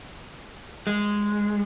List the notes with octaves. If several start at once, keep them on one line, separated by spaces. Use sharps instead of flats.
G#3